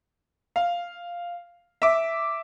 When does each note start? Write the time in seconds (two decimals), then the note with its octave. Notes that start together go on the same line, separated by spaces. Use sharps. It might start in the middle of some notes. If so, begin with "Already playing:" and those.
0.56 F5
1.82 E5 D6